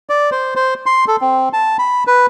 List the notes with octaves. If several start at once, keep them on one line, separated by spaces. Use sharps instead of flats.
D5
C5
C5
C6
A4
C4
A5
B5
B4